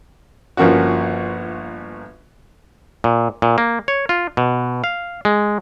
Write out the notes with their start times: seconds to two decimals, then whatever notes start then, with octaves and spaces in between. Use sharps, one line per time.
0.57 G1 F3 A#3 C#4 F#4
3.04 A#2
3.42 A#2
3.58 A#3
3.88 C#5
4.09 F4
4.37 B2
4.84 F5
5.25 G#3